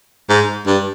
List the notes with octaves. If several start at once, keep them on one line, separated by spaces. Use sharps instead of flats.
G#2
G2